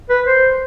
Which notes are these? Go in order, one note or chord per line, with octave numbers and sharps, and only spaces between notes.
B4
C5